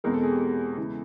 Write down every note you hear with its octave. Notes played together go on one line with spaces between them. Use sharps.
E2 B2 G#3 C4 A#4
A4
G#4
G4
A4
E2 C#3 E3 G#3